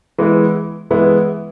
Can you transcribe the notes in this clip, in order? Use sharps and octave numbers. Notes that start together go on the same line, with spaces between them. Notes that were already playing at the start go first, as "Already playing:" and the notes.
E3 G#3 B3 E4
E3 G#3 B3 E4